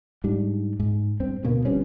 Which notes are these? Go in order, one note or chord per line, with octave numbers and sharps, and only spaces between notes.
G#2 G3 D4
G#2
G2 C4
D2 B2 A#3
G1 G2 C4 C#4